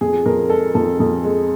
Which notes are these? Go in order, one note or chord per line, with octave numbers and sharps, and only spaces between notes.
F2 G#4
F2 A#4
G#3 A4
F2 A4
F2
G#3